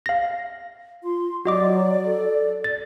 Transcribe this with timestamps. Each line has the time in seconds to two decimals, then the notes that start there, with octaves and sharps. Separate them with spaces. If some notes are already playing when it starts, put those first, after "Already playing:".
0.06 F5 A#6
1.03 F4 C6
1.45 F#3 F#4 D5 D#5 D6
2.06 A4
2.64 A6